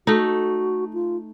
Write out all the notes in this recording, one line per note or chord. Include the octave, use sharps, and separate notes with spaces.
A3 D#4 F#4
F4